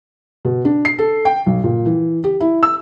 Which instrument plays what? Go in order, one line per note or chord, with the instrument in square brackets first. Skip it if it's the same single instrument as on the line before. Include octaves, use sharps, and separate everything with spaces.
[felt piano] B2
D4
C7
A4
G5
B1
A#2
E3
G4
E4
E6